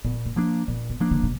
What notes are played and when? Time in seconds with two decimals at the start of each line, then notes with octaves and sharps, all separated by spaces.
0.05 A#2 B3
0.25 A#3
0.36 F3 A#3 D4
0.68 A#2 B3
0.90 B3
1.00 F3 A#3 D4
1.11 D3
1.23 B2